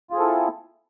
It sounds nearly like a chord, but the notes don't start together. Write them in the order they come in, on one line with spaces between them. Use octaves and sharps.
F4 G#4 C4 A4 E4